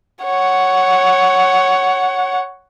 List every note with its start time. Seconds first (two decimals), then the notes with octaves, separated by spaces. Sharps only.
0.25 C#5 F#5